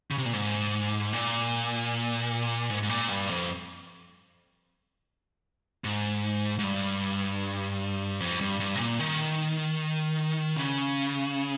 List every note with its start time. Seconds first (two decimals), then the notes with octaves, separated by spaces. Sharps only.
0.11 C#3
0.18 C3
0.25 A#2
0.33 G#2
1.13 A#2
2.70 G#2
2.82 G#2
2.90 A#2
3.09 G2
3.29 F2
5.84 G#2
6.59 G#2
6.63 G2
8.20 F2
8.41 G2
8.60 G2
8.76 C3
8.80 A#2
9.00 D#3
10.56 C#3